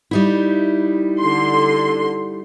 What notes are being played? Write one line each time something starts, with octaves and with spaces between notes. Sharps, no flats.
G3 D#4 E4
D3 C6